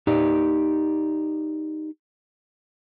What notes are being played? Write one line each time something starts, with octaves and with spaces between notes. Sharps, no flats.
D#4 G4 D5